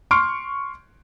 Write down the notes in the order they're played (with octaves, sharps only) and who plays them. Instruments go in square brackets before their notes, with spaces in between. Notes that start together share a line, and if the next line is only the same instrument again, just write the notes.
[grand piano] C6 C#6 F6 D7